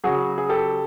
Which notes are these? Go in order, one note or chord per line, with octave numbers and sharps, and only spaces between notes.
C#3 F#3 F#4 G#4
G#4
G4 A4